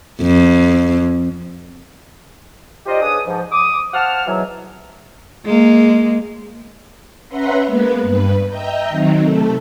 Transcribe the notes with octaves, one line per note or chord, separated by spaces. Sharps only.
F2
D#4 F4 G4 C5 D5 D#5
C#3 D4 G#4 B4 D#6
G#2 F3
D6 D#6
C5 F5 F#5 A5 F6
G#2 B2 E3 F#3
G#3 A#3
C#4 B4 E5 F#5 A#5 C6
G#3 A#3 B3 B4
G2 B4
D#5 E5 G5 A#5 G6
D#3 F#3 C4 D#4
C3 A3 A4